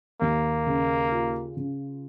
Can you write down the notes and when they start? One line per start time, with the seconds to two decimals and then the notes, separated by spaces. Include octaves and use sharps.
0.21 D#2 A#3
0.67 C#3
1.11 F4
1.57 C#3